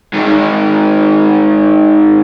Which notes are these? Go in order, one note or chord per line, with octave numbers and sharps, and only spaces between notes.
G#2 D#3